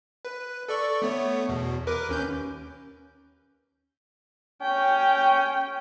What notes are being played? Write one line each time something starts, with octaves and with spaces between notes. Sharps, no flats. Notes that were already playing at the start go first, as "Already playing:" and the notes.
B4
A4 D5 C#6
A3 B3 C#5
E2 B2
A#4 B4 D6
D#2 C#4 G6
C#4 G5